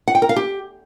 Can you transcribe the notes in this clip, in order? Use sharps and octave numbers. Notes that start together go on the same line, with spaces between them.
F#5
G5
A#4
F5
G4